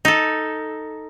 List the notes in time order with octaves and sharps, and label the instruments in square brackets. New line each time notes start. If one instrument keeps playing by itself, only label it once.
[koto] D#4 A4